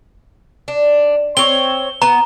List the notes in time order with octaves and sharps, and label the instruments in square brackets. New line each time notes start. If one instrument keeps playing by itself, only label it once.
[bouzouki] D4
[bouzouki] C4 C#5 [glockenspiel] G7
[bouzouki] B3 [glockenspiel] A#5